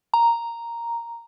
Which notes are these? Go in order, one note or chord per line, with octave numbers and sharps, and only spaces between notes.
A#5